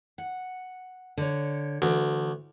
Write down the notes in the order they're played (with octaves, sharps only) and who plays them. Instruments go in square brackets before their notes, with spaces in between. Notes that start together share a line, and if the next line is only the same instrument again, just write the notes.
[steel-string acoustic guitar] F#5
D3 C#5
[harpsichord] D2 [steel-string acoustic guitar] E3